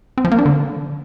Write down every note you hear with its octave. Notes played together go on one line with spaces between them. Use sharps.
C4
F3
A#3
D4
D3